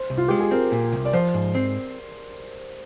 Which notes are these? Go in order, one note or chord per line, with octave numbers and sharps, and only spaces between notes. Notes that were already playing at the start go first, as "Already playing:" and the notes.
Already playing: C5
C2
F4
G#3 G4
G#4
C4 A#4
A#2
C2
D5
F3 C5
G#2
C4